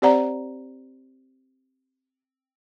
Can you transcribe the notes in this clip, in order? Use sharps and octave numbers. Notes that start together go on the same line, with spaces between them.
C4 G4 C5 D5 F#5 A#5